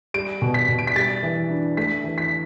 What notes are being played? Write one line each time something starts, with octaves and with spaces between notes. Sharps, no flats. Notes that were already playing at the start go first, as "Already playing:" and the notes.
G3 D7
B2
B6
B2
D7
B6
G3 A6
E3
D4
A3 B6
E3
B6